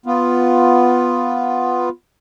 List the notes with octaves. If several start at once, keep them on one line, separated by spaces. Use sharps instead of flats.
B3 F4